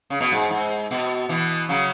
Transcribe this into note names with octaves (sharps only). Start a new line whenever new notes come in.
C#3
B2
G#2
G#2
B2
B2 E3
C#3 F#3